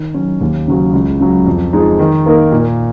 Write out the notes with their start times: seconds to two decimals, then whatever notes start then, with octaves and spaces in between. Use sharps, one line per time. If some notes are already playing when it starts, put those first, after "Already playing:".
Already playing: D#3
0.14 F#3 C#4
0.41 D#2
0.68 C#3 F#3 C#4 F#4
0.93 C#2
1.20 C#3 F#3
1.47 F2
1.73 F3 G#3 D#4
1.99 D#3
2.26 A#3 D#4 A#4
2.52 A#2